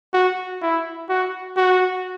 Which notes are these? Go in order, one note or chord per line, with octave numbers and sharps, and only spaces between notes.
F#4
E4
F#4
F#4